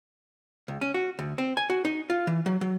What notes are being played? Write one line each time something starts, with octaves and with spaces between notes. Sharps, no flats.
C#2
C#4
F#4
D2
C4
G#5
F#4
D#4
F4
E3
F#3
F#3